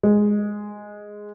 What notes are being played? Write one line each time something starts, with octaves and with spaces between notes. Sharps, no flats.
G#3